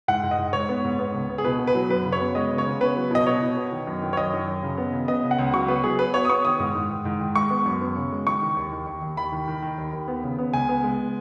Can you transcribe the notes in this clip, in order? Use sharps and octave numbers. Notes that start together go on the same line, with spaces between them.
G#2 F#5
G#2
D#5
G#2
G#2 C#5
B3
G#2
B3
C#2
B3
G#4
B2 B4
B3
B4
F#3
F#2 B4
C#3
C#5
B3
G#3 D#5
C#3
C#5
C#3
B3 B4
F#3
B2 D#5
B2 C#5
B2
B3
D#3
F#2
D#3
C#5
F#2 D#5
D#3
F#2
C#3
B3
C#3
B3 D#5
C#3
F#5
C#2
F#3 C#6
B3 B4
F#3 G#4
B3 B4
B3 C#5
D#6
B3 C#6
D#3 D#6
G#2
G#2
D#3
G#2
D#3
G#3 C#6
B3
F#2
B3
C#3
G#3
D#3 C#6
D#3
D#2
D#3
D#2
D#2
D#2 B5
D#3
D#3
D#3
D#2
D#2
B3
C#3
B3
C#2 G#5
B3
G#3